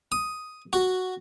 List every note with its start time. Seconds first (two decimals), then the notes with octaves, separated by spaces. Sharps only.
0.12 D#6
0.73 F#4